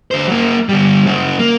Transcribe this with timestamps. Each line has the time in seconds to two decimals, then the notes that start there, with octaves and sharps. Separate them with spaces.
0.11 D3 C5
0.28 F#3 A#3
0.69 D3 G3
1.06 C#3 F#3
1.39 A#3